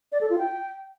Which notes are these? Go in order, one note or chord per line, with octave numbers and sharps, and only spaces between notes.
D5
A4
F4
G5